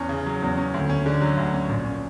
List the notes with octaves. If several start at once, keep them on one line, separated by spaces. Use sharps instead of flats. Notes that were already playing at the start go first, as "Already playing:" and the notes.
Already playing: E2 C#4
C#3
F#3
E2
C#4
D2
C#4
D3
F#3
D2
C#4
A#1
C#4